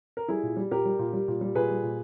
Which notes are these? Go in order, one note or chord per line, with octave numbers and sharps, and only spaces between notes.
A#4
G3 E4 G#4
A#2
G3
A#2 G4 A#4
G3
A#2
G3
A#2
G3
A#2 G#4 B4
G3
A#2